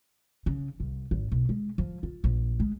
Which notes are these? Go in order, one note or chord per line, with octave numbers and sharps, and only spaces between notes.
C#3
C2
G#1
B1
G#3
F3
F4
A#1
G#3